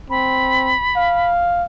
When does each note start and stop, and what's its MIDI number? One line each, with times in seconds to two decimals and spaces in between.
0.10 0.75 60
0.10 1.30 83
0.96 1.64 77